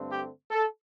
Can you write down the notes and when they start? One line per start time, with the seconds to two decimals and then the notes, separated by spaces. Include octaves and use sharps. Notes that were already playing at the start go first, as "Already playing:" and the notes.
Already playing: G2 D3 A3 C4
0.12 G4
0.51 A4